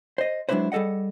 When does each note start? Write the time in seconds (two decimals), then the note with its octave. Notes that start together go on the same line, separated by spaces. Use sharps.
0.18 C5 D#5
0.49 F#3 G#3 D4 E4 B4 C5
0.72 G3 G#4 A4 D#5 F#5